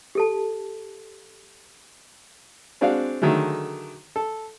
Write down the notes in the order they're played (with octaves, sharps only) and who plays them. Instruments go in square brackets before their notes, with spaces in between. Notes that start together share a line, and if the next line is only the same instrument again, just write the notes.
[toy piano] G4 A4 A5
[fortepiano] G#3 C4 D4 F#4 D5 F5
D3 D#3 F#3 G#3 A3
A4